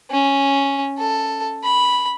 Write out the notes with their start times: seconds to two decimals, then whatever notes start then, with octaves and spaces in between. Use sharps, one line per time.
0.11 C#4
0.98 A4
1.64 B5